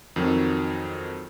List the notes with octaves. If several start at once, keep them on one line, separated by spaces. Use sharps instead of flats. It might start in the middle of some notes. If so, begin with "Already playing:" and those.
F2 D#3 F#3